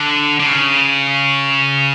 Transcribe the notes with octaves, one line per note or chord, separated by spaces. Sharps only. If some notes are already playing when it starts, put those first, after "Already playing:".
Already playing: D3
D3
C#3